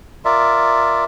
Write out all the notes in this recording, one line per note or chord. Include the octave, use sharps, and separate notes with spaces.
F4 A#4 D5 E5